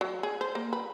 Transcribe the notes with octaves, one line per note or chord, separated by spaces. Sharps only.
F#3
G#4
C5
A#3
B4